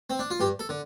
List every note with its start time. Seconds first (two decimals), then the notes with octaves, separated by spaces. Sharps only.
0.10 C4
0.19 D4
0.30 F4
0.40 G2 G4
0.59 A4
0.69 D3